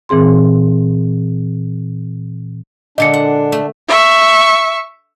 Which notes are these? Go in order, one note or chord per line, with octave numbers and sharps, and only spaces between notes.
A#2 E3 C4 G#4 C6
A#2 D3 G#3 D4 D#5 C#7
F#5
A3
E5 C#6